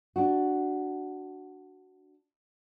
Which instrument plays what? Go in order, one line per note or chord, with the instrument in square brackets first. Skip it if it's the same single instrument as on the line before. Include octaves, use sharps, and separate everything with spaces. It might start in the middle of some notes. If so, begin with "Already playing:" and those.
[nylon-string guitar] D4 F#4